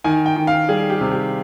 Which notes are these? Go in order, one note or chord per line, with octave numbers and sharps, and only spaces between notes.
D#3 G#5
G5
D#3
F5
G3 G#4
G4
C3
G4